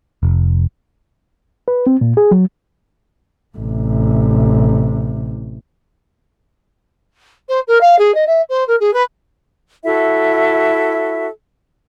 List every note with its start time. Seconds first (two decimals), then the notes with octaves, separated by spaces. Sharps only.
0.23 F1
1.68 B4
1.87 C4
2.01 A#2
2.17 G#4
2.31 F#3
3.58 A1 C3
7.49 C5
7.67 A#4
7.81 F5
7.99 G#4
8.15 D#5
8.27 E5
8.49 C5
8.67 A#4
8.80 G#4
8.93 B4
9.84 E4 F#4 A4 E5